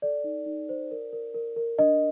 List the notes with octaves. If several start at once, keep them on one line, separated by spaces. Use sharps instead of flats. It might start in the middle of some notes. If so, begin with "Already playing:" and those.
A4 D5
D#4
D#4
C5
A#4
A#4
A#4
A#4
D4 D#5